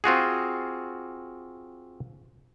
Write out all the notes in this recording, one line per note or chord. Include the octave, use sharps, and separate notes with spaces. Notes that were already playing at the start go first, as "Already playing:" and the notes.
C4 F4 F#4 G#4